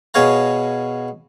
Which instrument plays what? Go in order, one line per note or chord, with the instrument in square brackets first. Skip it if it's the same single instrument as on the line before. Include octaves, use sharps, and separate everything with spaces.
[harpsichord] B2 G#4 C#5 F5 A#5